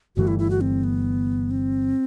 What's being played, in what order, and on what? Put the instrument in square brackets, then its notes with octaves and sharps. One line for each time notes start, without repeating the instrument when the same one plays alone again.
[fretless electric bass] G1 G2 E3 A3 [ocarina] F#4
[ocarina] E4
E4
F#4
C4
B3
C4